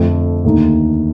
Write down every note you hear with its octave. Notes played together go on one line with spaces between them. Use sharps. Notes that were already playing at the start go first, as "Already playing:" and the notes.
Already playing: F2 D3 A3
D#2 D3 A3 D#4